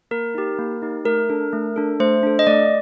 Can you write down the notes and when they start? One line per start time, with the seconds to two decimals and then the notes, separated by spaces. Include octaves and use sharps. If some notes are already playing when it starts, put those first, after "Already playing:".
0.11 A#3 A#4
0.35 D#4 G4
0.59 A#3
0.82 D#4 G4
1.05 A3 A#4
1.30 D4 A4
1.53 A3
1.76 D4 A4
2.00 A3 C5
2.23 D4 A4
2.39 D#5
2.47 A3 D5